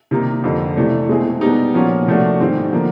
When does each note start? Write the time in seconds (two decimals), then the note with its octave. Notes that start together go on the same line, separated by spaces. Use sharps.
0.11 C3 D#3 G3 A#3 D#4
0.44 F2 D3 G3 C4
0.76 C3 E3 A3 D4
1.09 B2 G#3 C4 E4 G#4
1.41 B2 G3 B3 D#4 G4
1.74 A#2 F3 A#3 C#4 F#4
2.07 C3 F3 A3 D4 F#4
2.40 G#2 D#3 G3 C4
2.73 D3 F3 A#3